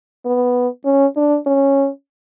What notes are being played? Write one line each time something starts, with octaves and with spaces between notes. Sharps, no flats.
B3
C#4
D4
C#4